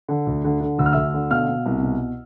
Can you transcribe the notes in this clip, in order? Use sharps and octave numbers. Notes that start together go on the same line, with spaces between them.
D3
D2
D3
D3
D2 E6
F6
D2 E5 E6
D3
B2 F5 F6
B2
C2
B2